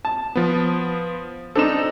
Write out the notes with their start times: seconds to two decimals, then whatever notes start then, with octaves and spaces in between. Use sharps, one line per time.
0.05 A5
0.36 F3 B3
1.55 C4 D4 D#4 A4 E7